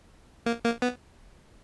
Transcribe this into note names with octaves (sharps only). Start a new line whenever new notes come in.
A#3
A#3
B3